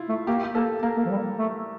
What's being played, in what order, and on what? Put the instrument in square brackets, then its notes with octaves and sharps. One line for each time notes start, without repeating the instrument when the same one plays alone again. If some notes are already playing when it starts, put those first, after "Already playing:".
Already playing: [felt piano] E4 F4
[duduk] A3
[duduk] A#3 [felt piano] G4
[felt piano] G4
[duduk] A#3 [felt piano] A4
[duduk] A#3 [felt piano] A#4
[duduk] A#3
F3
G3
A3